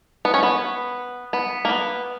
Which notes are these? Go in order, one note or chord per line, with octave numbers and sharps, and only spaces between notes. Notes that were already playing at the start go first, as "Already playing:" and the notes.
B3
C#4
B3
B3
A#3
B3